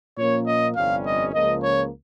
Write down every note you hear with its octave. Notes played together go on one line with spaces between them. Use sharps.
A#2 F3 A#3 C#4 C#5
D#5
G1 F2 C3 G3 C#4 F5
D#5
C#2 C#3 F3 A#3 D#5
C#5